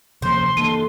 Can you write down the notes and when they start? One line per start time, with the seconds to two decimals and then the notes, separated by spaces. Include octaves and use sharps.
0.22 C3 F3 A#3 C5 C6
0.57 E3 A#3 A4 D#7